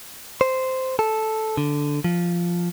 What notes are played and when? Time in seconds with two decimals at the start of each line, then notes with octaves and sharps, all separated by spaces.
0.41 C5
0.99 A4
1.57 D3
2.04 F3